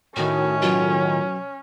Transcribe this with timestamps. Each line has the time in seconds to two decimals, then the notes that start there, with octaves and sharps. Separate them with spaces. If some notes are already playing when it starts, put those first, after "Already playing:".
0.16 A2 D#3 C#4 F#4
0.62 F#2 B2 F#3 F4